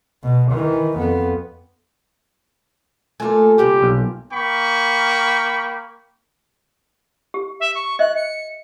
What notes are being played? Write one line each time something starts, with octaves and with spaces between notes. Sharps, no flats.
B2
D#3 E3
F2 B3
A3 A#3 D#4 F4 G#5
D2 G2 C3 G4
B1
A#3 G5 B5 C#6
G4
E5
C#6
D#5 E5 F#6
C#7